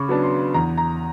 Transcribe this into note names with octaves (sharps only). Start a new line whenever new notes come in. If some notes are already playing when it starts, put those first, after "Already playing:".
Already playing: C#3 B5 C#6 D6
F#3 B3 D4
C6
E2 A#5
A#5